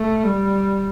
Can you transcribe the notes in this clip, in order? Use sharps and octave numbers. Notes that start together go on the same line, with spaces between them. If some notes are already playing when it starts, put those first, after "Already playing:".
Already playing: A3
G3